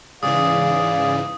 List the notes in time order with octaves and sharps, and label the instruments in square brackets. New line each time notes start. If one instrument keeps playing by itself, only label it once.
[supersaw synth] G#2 C#3 E3 [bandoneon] G#4 D5 [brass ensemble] F5 [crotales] D#6